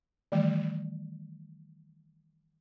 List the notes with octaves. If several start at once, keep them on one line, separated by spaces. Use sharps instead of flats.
D#3 E3 G3 A3